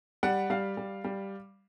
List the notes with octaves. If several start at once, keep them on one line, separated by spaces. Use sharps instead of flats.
G3 F#5
G3 F5
G3
G3